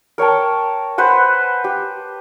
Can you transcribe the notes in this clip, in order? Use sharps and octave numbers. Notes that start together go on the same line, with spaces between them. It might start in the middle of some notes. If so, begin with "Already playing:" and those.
A#4 C#5 G5 A5
B4 C5 F#5 G#5
G4